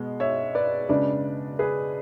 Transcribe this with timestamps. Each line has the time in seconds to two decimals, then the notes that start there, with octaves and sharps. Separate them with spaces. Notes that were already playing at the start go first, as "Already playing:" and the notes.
Already playing: B2 G#3 B3
0.20 C#5 E5
0.55 B4 D5
0.89 C#3 G#3 D4 B4 D5
1.59 G#4 B4